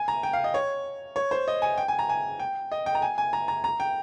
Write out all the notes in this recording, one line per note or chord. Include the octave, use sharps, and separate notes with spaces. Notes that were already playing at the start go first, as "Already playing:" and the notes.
Already playing: G#5
A#5
G5
F5
D#5
C#5
C#5
C5
D#5
G#5
G5
G#5
A#5
G#5
G5
D#5
G5
A#5
G#5
G#5
A#5
A#5
A#5
G5